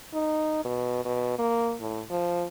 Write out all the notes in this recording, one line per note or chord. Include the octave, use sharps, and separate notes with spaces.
D#4
B2
B2
A#3
A2
F3